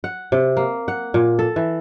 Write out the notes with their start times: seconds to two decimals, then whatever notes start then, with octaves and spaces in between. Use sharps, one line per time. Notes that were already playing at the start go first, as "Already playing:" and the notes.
0.04 F#5
0.32 C3
0.57 A#3
0.88 F#5
1.14 A#2
1.39 A4
1.56 E3